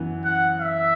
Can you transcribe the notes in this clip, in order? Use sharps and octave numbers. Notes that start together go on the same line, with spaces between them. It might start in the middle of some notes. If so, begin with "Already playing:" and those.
Already playing: F#2 E3 B3
F#5
E5